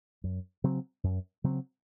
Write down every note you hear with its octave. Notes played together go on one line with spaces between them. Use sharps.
F#2
C#3 F#3 C4
F#2
C#3 F#3 C4